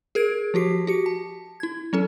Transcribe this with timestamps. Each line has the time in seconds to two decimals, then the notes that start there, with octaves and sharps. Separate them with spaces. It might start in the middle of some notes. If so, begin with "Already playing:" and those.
0.15 G#4 A#4 G#6 D7
0.54 F3 F#4 G4 C7
0.87 F#4 G4 C#7
1.06 A5
1.60 E4 G#6
1.93 F#3 C#4 A4